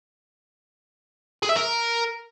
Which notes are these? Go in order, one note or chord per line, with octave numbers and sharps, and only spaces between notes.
G#4
E5
A#4